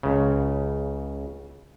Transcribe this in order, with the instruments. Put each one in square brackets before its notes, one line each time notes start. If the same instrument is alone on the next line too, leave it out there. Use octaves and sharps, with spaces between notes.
[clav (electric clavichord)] C#2 C#3